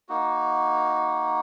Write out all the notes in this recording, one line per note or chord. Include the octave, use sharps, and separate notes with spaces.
A#3 D#4 F#4